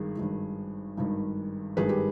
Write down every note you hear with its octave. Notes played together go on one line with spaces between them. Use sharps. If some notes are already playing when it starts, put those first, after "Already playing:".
Already playing: G#1 G2 D#3 G#4
G#1 G2 D#3
G#1 G2 D#3
G#1 G2 D#3 G#4 B4
G4